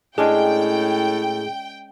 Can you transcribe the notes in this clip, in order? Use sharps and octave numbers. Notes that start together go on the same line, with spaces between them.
A2 G#3 C#4 D4 G#4 G5